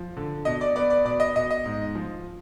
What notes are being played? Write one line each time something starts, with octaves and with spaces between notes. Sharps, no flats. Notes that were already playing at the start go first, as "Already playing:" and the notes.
Already playing: F3
D3
B2 D#5
D5
B3 D5
D5
B2 D5
D#5
B2 D#5
D#5
G#2
F3